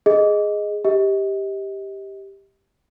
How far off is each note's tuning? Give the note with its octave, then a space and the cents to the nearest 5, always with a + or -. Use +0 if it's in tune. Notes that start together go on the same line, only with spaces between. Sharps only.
G#4 +0 D#5 +0
G4 +0 D#5 +35